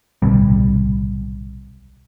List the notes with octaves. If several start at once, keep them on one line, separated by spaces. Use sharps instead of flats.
D1 B1 C3 G3